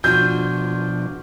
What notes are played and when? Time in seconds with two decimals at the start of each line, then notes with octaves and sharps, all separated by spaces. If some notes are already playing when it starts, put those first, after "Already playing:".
0.04 B2 F3 D4 F4 F#4 F6 G6